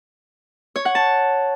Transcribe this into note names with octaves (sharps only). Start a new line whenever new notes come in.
C#5
F#5
A5